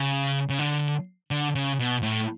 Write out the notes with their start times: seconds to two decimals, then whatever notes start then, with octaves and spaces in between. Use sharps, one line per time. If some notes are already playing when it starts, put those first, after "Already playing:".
Already playing: C#3
0.50 C#3
0.59 D3
1.31 D3
1.55 C#3
1.79 B2
2.03 A2